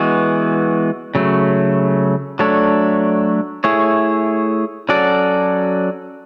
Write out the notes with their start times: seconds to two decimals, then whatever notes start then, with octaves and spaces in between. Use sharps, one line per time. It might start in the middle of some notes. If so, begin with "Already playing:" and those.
Already playing: E3 G#3 B3 F#4
1.15 C#3 F#3 A3
2.39 F#3 A3 D4 A4 C#5
3.64 A3 E4 G#4 C#5
4.89 F#3 C#4 F#4 A4 D5